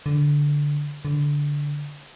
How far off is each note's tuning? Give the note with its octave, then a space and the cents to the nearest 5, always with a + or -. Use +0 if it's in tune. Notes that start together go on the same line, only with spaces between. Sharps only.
D3 -10
D3 -15